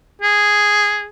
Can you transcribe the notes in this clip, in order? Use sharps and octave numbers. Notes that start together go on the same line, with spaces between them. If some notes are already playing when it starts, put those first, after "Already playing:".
G#4